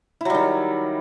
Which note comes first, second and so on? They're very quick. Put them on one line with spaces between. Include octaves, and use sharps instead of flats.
E4 F#3 G3 D#3